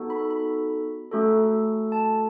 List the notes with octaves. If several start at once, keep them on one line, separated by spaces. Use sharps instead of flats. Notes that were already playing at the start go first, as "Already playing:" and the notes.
Already playing: B3 D#4 F#4 A4
B5
B5
A3 C#4 F#4 A4
A5